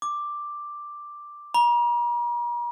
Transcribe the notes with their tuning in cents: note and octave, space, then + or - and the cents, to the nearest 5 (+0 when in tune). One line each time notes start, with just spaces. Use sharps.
D6 +5
A#5 +45